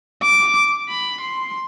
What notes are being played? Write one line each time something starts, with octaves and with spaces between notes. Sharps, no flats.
D6
B5
C6